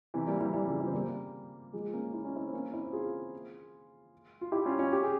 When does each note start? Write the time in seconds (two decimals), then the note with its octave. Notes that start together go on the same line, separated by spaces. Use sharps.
0.14 C3 E3
0.27 G3 A#3
0.40 E3 G3
0.54 E3 G3
0.67 C#3 F3
0.80 E3 G3
0.87 C4
0.94 G3 A#3
1.73 F3 G#3
1.93 A#3 C#4
2.13 E4
2.25 C#4
2.36 C4 E4
2.53 A#3 C#4
2.73 C4 E4
2.93 F4 G#4
4.41 F4
4.52 E4 G4
4.66 C#4 F4
4.79 C#4 F4
4.93 G4
5.03 G#4